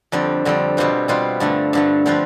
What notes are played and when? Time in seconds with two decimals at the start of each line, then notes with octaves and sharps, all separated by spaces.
0.12 F2 D3 G3 C4
0.45 F2 D3 G3 C4
0.77 B2 G3 C4 F4 B4
1.08 B2 G3 C4 F4 B4
1.40 G2 D3 A3
1.73 G2 D3 A3
2.06 D3 F3 C4 F4 B4